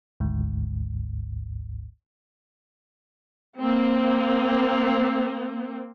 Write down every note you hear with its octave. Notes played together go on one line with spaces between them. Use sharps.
G#1 D2 G#2
A#3 C4